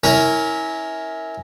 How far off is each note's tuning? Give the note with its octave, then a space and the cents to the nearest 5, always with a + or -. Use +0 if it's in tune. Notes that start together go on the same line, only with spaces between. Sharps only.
C#4 +0 E4 -25 A#4 +0